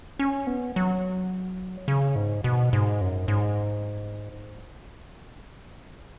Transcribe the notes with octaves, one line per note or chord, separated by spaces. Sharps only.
C#4
B3
F#3
C#3
G#2
B2
G#2
F#2
G#2